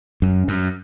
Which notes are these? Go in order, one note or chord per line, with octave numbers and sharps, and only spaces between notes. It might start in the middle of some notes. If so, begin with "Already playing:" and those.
F#2
F#2